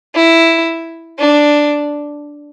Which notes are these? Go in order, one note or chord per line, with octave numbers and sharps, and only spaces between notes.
E4
D4